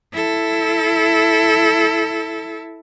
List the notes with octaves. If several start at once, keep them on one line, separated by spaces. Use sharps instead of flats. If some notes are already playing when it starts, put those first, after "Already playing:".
E4 A4